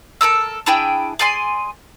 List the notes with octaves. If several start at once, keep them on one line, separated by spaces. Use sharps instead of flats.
A4 A#4 D#6 E6
D4 E4 G#4 G5
G#4 D5 G#5 C6